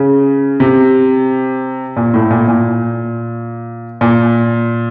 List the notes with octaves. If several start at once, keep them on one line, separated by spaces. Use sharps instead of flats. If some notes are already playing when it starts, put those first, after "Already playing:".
Already playing: C#3
C3
A#2
A2
A#2
A#2
A#2